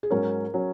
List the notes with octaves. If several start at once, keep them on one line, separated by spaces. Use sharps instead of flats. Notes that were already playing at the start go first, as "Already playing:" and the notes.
G#4
G#2 F#3 C#4 A#4
F#3 C#4